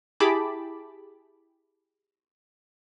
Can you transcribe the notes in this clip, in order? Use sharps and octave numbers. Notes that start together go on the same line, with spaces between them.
E4 G4 G#4 A5 B5 D6